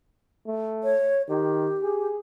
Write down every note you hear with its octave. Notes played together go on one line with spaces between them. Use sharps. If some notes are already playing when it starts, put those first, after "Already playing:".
A3
C#5
D#3 G4
G#4